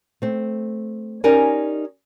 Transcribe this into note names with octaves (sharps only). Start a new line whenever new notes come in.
A3 C4
C#4 D#4 G4 A#4 D5 G#5